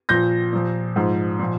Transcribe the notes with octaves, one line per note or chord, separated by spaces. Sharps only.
A#2 F3 G6 A#6
A#2 F3
G#2 F3
A#2 F3